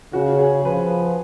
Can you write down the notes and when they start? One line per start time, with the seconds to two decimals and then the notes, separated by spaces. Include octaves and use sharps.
0.13 C#3 F#4
0.39 G#4
0.64 F3 B4